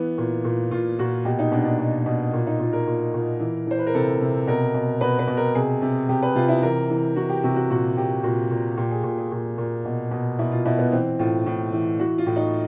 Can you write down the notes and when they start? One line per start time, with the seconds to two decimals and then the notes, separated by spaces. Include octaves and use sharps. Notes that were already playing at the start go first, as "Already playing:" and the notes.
Already playing: E3 B3
0.18 A#2
0.45 A#2
0.71 A#2 F4
0.99 A#2 F#4
1.25 B2 G4
1.39 D#4
1.52 B2 D4
1.65 D4
1.79 B2
2.06 B2
2.33 A#2
2.47 D#4
2.59 A#2 F4
2.73 A#4
2.87 A#2
3.14 A#2
3.40 E3
3.67 E3 C5
3.79 B4
3.87 A#4
3.95 C3 A4
4.21 C3
4.47 B2 A#4
4.74 B2
5.01 B2 B4
5.19 B4
5.28 B2
5.37 A#4
5.55 C3 G#4
5.82 C3
6.09 C3 G4
6.22 B4
6.36 C3 F4
6.49 E4
6.62 E3 A#4
6.90 E3
7.16 E3 F#4
7.29 G4
7.44 C3 F#4
7.56 F#4
7.70 A#2 F#4
7.97 A#2 G4
8.24 A#2 F#4
8.51 A#2
8.77 A#2 G4
8.91 G#4
9.04 A#2
9.18 G#4
9.32 A#2
9.58 A#2
9.85 B2
10.11 B2
10.39 B2 E4
10.52 F4
10.66 B2 E4
10.78 B3
10.92 E3 C4
11.19 A2 F4
11.46 A2
11.73 E3
11.99 E3 F#4
12.18 F4
12.26 A2
12.36 D#4